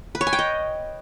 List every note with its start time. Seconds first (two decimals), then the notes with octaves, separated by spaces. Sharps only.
0.15 B4
0.21 C#5
0.27 G#5
0.33 G5
0.39 D#5